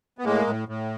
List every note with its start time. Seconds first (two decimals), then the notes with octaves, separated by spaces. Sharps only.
0.18 B3
0.24 A2 G#3 A#3
0.47 A2
0.68 A2